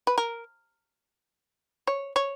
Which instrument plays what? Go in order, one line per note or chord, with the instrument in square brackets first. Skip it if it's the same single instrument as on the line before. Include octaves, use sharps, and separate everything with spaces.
[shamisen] B4
A#4
C#5
C#5